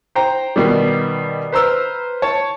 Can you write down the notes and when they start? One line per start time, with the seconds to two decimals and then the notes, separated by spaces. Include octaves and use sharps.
0.15 C5 G5 A#5
0.56 B2 D#3 G3
1.52 B4 C5 A#5 E6 F6
2.22 C#5 A5